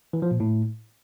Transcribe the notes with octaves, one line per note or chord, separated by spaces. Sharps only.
E3
F3
A#2
A2